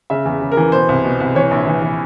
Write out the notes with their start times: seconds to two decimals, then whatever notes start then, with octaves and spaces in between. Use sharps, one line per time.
0.10 C#3 E5
0.25 E2
0.42 C#3
0.52 A#4
0.57 E3
0.72 B2 C5
0.89 C2
1.04 B2
1.20 C2
1.35 E3 C#5
1.51 A#1
1.67 E3
1.82 E3